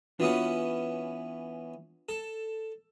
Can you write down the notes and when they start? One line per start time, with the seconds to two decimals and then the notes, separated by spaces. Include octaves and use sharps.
0.20 E3 B3 C#4 D4 F4 F#4
2.09 A4